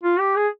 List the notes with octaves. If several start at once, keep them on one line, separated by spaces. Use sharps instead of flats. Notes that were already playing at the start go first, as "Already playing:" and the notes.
F4
G4
G#4